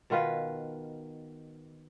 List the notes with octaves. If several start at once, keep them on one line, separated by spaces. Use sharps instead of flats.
B2 D#3 F4 B4